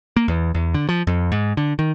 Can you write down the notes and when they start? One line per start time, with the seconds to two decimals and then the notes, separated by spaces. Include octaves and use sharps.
0.16 A#3
0.28 E2
0.55 E2
0.74 D3
0.89 F3
1.07 F2
1.32 G#2
1.57 D3
1.79 D#3